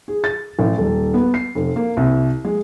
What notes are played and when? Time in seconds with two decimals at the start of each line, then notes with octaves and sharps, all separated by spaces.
0.08 G#4
0.24 A6
0.59 A1
0.78 D#1
1.14 B3
1.34 C7
1.55 F1
1.76 A#3
1.97 C2
2.45 G#3